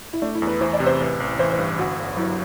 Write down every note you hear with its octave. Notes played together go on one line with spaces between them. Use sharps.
E4
A3 D4
E4
E2
B4
E3 C5
D5
C3
C5
A1 B4
A1
E3 C5
C5
G2
G1 F#4
G1
F#3 E4